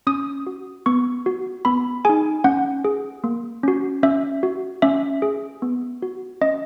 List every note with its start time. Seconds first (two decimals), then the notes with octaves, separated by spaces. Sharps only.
0.07 C#4 D#6
0.47 F#4
0.86 B3 C#6
1.26 F#4
1.65 B3 B5
2.05 D#4 G#4 G#5
2.44 C#4 F#5
2.85 G#4
3.24 A#3
3.63 C#4 F#4
4.03 C#4 E5
4.43 F#4
4.82 C#4 E5
5.22 G#4
5.62 B3
6.02 F#4
6.41 C#4 D#5